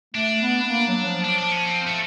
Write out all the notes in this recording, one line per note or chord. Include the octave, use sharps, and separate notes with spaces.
A3 D4
B3
B3
A#3
F#3
F3
D4
D4
C#4
C4
A3